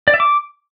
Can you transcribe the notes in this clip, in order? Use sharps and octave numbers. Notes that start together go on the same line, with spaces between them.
D5
E5
D6